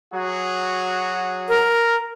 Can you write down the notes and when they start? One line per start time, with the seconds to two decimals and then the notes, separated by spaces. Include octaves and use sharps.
0.14 F#3 F#4 G#4
1.48 A#4